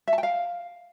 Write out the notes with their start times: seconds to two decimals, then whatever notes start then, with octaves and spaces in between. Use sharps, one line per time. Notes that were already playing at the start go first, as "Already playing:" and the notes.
0.08 E5
0.13 A5
0.18 G5
0.23 F5